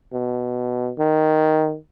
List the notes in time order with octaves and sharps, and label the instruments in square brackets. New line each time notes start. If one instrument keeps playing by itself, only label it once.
[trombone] B2
D#3